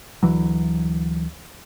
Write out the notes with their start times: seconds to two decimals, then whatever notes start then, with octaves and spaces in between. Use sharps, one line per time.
0.23 D2 E3 F#3